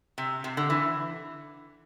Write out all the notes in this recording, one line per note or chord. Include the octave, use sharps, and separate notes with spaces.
C3
C3
D3
E3